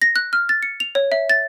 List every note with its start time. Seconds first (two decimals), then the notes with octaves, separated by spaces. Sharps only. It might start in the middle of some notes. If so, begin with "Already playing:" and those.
0.02 A#6
0.16 F#6
0.33 F6
0.49 A6
0.63 C#7
0.80 F7
0.95 C#5
1.12 E5
1.30 A6